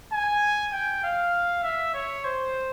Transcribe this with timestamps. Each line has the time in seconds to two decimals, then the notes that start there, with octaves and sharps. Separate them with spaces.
0.13 G#5
0.72 G5
1.04 F5
1.63 E5
1.94 C#5
2.24 C5